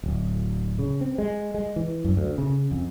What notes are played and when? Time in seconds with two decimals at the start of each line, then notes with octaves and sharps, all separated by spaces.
0.03 D1
0.79 C#3
1.01 C4
1.18 G#3
1.54 G#3
1.76 E3
2.04 F#2
2.17 D2
2.38 C#3
2.71 F2